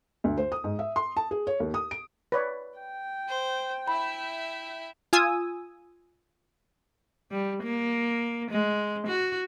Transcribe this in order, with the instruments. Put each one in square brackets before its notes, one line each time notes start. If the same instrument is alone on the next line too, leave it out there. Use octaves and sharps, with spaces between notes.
[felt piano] D2
C5
D#6
G#2
E5
C6
A5
G#4
C#5
D#2
D#6
D7
[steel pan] B4 C#5 D5
[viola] G5
[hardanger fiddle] C5
[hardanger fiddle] E4 E5 [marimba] B5
[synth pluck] F4 G#5 D#6 E6
[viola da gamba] G3
A#3
G#3
F#4